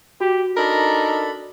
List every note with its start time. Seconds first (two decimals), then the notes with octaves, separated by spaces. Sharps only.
0.21 F#4 G4
0.57 D4 D#4 A4 A#4 B5